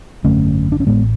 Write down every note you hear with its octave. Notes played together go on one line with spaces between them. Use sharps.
G#1 F#2 D3 A3 C#4
D4
C#4
A1 A2 G#3 B3